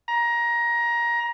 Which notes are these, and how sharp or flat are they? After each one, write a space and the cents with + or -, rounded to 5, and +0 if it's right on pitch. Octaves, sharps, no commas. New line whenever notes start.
A#5 +20